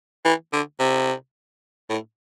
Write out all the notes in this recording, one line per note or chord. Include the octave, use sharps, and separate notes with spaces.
E3
D3
C3
A2